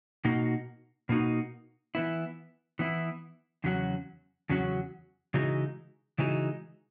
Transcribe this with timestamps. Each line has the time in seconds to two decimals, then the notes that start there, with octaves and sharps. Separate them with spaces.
0.25 B2 A#3 D#4 F#4
1.09 B2 A#3 D#4 F#4
1.95 E3 B3 E4
2.79 E3 B3 E4
3.64 E2 C#3 F#3 C#4 F#4
4.49 E2 C#3 F#3 C#4 F#4
5.34 C#3 E3 G#3 D#4 F#4
6.18 C#3 E3 G#3 D#4 F#4